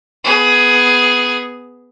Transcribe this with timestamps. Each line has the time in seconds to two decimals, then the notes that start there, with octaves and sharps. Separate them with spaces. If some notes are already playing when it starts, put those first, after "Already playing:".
0.24 B3 G#4